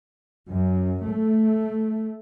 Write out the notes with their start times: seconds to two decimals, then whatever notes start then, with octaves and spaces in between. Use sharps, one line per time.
0.50 F#2
1.07 A3